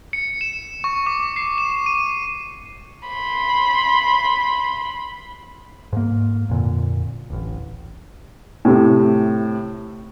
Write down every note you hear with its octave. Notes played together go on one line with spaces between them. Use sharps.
C#7
E7
C#6
D6
C7
E7
D#7
B5 C6
G#2 A#3
F2 A#2 D3
D1 A1
A2 C3